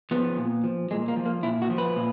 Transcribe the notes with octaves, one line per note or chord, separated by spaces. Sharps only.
F3 B3
A#2
F3
A#2 G#3
A#3
F3
A#3
A#2 E4
F#4
F3
B4
A#2